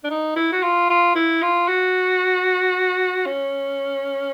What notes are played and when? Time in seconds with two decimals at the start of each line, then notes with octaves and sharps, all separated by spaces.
0.04 D4
0.11 D#4
0.36 E4
0.53 F#4
0.63 F4
0.90 F4
1.16 E4
1.43 F4
1.68 F#4
3.26 C#4